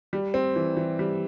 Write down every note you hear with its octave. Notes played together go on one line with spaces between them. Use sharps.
G3
C4
E3
E3
G3